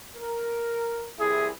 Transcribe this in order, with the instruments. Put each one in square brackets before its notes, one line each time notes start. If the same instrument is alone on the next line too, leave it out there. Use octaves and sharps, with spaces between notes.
[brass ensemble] A#4
[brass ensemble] C2 E4 E5 [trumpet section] G#4